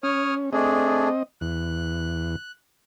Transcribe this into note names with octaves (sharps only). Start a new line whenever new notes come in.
C#4 C#5 D#6 F6
A3 C4 D4 G#4 D#5
E2 F#6